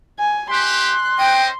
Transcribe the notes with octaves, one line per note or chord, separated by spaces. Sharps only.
G#5
E4 G4 C6 F#6
C#4 C5 D#5 G5